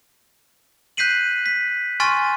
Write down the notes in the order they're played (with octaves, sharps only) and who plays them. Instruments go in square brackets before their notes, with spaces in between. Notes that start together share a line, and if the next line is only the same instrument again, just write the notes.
[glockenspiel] F#6 G6 B6 C7 D#7 F#7
B6
G#5 C6 C#6 F6 A6 D#7